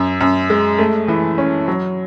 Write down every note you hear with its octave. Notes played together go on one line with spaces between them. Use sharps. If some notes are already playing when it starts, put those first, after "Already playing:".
Already playing: F#2
F#2
G#3
A3
E3
C#4
F#3